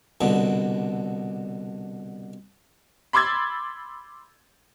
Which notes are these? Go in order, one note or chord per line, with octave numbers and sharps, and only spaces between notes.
C2 B2 D3
B5 C6 D6 E6 G#6 A6